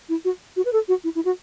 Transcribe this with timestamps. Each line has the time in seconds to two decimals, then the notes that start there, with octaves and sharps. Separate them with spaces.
0.09 E4
0.25 F#4
0.56 F#4
0.65 B4
0.73 A4
0.88 F#4
1.04 E4
1.15 E4
1.25 F#4